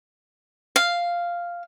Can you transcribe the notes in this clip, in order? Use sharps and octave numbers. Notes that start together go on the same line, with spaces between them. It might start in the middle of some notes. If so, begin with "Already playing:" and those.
F5